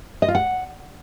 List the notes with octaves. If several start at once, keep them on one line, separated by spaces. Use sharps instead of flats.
D#5
F4
F#5